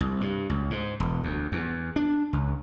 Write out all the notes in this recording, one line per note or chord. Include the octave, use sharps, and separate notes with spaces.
C2
G2
C#2
G#2
E1
D2
E2
D4
C#2